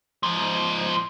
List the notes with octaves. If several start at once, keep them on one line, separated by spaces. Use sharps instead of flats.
G#2 F3